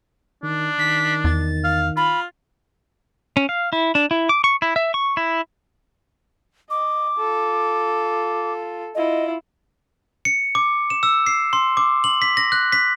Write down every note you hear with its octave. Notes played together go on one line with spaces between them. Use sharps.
D#3 D4
D#3 B6
E2 A6
F5
F4 B5
C#4
F5
E4
D4
E4
D6
C#6
E4
E5
C#6
E4
D#5 D6
F4 A4
E4 F4 D#5
C#7
D6
E7
E6
C7
C6
D6
F#7
B6
A#6
F#6
B6